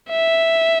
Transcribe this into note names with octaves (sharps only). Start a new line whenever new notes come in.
E5